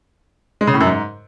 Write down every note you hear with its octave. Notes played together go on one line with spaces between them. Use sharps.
G#3
C#3
A2
F#2
G#2